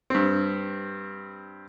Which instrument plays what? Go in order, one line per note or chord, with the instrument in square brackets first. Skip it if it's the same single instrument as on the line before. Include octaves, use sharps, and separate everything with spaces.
[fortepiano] G2 C4